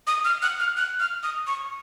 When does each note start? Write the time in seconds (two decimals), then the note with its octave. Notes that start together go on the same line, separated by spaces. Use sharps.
0.07 D#6
0.25 F6
0.42 F#6
0.60 F6
0.77 F#6
1.00 F6
1.23 D#6
1.47 C#6